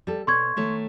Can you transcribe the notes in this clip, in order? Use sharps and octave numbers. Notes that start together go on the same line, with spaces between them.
G3 A4
B2 C#5 C6 C#6 G#6
D#3 A3 C#5